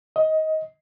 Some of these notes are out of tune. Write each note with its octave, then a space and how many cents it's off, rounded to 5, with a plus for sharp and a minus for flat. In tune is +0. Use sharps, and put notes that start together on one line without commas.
D#5 +20